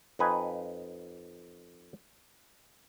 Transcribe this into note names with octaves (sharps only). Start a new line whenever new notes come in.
F2 D#4 B4 G#5